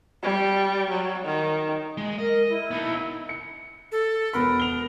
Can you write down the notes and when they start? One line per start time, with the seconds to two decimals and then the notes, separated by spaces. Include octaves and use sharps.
0.22 G3
0.90 F#3
1.25 D#3
1.97 G#3
2.18 A#4 D#5
2.49 E4
2.71 B3 D#4
3.29 C#7
3.92 A4
4.33 E1 B3 A#4 B5
4.60 F7 G7